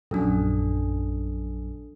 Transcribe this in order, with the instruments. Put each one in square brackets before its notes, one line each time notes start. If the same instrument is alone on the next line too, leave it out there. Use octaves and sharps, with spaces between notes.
[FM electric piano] A#1 F#2 [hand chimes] D4 A4